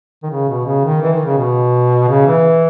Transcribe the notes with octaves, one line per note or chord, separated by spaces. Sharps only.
D#3
C#3
B2
C#3
D#3
E3
D#3
C#3
B2
C#3
E3